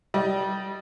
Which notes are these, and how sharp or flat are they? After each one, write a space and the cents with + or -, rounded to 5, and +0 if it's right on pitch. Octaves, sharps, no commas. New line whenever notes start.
G3 -20 D#5 +0